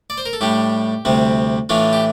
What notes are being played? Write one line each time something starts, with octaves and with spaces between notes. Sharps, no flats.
D5
C5
A#4
A4
A2 G3 D4 G4
D2 C3 G3 C4
A2 E3 A3 D4 F4
G4